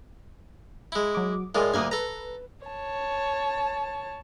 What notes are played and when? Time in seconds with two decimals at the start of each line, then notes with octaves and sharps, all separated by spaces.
0.92 G#3 E4
1.15 F#3 D6
1.55 A2 G#3 F4 A#4 D5 G#5
1.74 D2 G2 A#3 G#5 D#6
1.91 A4 B4 A#5
2.66 C#5 A5